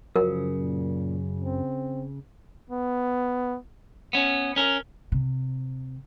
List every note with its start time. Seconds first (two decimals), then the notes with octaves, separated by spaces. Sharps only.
0.16 F#2 C#3 F3 A#4 D#6
0.59 A#2
1.43 C4
2.71 B3
4.13 B3 C#4
4.56 C#4 A#4
5.12 C3